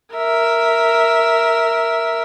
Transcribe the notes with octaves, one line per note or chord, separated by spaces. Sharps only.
A#4 E5